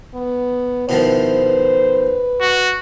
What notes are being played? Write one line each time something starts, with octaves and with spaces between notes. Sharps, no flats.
B3
B2 D#3 F3 E4 C5
B4
F#4